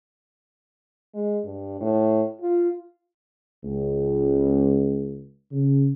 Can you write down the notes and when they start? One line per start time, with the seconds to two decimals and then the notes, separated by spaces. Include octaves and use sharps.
1.14 G#3
1.45 G2
1.81 A2
2.41 F4
3.64 C#2
5.52 C#3